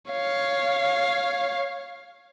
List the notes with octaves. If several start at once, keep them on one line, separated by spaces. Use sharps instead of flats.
C#5 F5